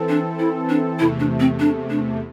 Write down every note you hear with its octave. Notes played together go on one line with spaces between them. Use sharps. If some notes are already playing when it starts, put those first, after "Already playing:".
Already playing: E3 C4 A4
D4
E4
D4
E2 C3 A3 E4
D4
C4
D4
D4